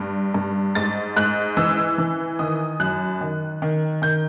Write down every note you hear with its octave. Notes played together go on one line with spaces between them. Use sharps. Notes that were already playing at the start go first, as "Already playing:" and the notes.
Already playing: G2
G2
G#2 A6
G#2 F#6
E3 E6
E3
D#3 D#6
F#2 F#6
D#3
D#3
D#3 G6